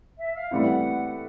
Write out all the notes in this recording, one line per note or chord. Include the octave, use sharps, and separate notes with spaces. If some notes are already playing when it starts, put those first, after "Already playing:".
E5
F5
A2 E3 G3 C4 E4 F#5